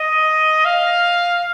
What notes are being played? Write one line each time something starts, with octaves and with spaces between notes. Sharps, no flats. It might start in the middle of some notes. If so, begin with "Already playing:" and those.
Already playing: D#5
F5